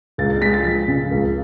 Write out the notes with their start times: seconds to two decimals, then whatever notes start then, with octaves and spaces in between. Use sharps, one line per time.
0.18 C#2 A6
0.30 A6
0.41 G#3 B6
0.54 A6
0.65 F3
0.88 C#3
1.11 C#2